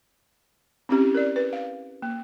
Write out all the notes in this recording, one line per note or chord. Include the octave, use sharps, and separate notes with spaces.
C4 C#4 E4 G4
A#4 D5
B4
F5
A#3